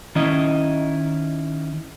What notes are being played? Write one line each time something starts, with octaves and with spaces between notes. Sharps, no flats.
D#3 C#4 E4 D#5